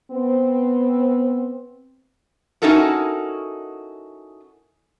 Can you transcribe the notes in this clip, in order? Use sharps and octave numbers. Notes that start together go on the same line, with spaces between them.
B3 C4
C#4 D#4 E4 F#4 A4 A#4